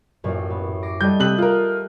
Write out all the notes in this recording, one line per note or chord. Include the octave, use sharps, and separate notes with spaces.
A1 F#2 A#2
B3
D6 A#6 C7
G3 A3 D#5 G6
C3 D#6 E6 F#6 F#7
F4 A#4